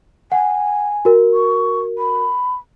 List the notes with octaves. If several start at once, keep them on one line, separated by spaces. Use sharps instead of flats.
F#5 G#5
F#4 A#4
C#6
B5